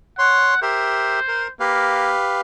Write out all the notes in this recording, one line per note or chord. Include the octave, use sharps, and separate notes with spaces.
C#5 F#5 C6
G4 A#4 C5 E5
A#4
A#3 G4 B4 F5